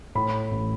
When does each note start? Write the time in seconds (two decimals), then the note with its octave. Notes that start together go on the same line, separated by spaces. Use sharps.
0.15 A2 B5
0.51 A1